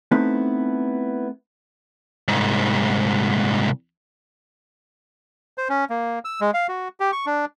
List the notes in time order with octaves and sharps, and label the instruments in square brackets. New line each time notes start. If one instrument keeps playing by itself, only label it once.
[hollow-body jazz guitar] A3 B3 C4 D#4 E4 B4
[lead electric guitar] C2 G#2
[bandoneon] C5
C#4
A#3
E6
G#3
F5
F#4
G4
C#6
D4